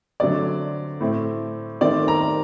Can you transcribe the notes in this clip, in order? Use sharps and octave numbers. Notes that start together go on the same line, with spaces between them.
D3 F#3 A3 C4 D5
A2 A3 C4
D#3 A3 C4 D5
A#5